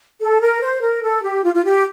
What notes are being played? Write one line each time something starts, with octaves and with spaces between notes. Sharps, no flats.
A4
A#4
C5
A#4
A4
G4
F4
F4
G4